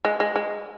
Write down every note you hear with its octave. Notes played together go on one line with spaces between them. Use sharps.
G#3
G#3
G#3